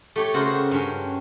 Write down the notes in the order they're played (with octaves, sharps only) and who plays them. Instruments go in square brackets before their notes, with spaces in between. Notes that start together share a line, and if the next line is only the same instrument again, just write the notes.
[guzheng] A3 G4 C#5
C#3 F#4 A#4 C5 G5
G2 C#4